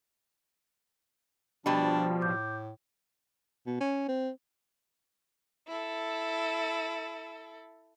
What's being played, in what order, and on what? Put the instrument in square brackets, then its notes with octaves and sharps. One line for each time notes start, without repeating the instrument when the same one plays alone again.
[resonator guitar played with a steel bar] B2 G3 [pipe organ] F3 [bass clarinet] D4 [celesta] G5 A5
[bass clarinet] A2 [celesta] D6 G6
[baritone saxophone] B2
C#4
C4
[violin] E4 A4